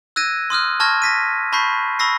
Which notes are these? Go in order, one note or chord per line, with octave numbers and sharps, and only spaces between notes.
E6 F#6 G#6 A#6 D#7
C6 D#6 F6 F#6
A5 C#6 F6 G#6 A#6
A#6 B6 D#7
A5 B5 C#6 G6 B6 C7
B5 C#6 E6 A#6 C7